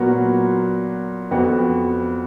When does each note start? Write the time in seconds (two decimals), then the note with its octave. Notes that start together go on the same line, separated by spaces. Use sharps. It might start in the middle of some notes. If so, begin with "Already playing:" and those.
Already playing: A#2 F#3 B3 F#4 A#4
1.31 F2 F3 B3 F#4